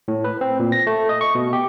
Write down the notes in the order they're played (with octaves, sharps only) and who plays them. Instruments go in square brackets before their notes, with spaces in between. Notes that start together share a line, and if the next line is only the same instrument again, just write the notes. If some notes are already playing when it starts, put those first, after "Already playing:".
[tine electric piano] A2
B4
C4
A#2
A#6
A3
D#5
C#6
B2
G4